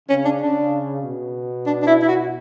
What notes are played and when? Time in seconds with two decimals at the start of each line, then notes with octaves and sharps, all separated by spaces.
0.09 C#3 C#4
0.25 D4
0.41 C#3 D4
1.03 B2
1.66 D4
1.82 D4
1.87 E4
2.02 E4
2.08 F#4